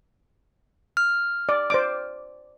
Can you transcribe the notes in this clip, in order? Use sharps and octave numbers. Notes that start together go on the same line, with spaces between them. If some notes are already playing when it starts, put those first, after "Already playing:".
F6
D5
C5 D5 D6